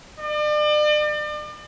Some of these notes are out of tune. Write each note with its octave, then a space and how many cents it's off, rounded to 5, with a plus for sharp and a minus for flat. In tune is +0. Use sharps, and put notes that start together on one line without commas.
D5 +40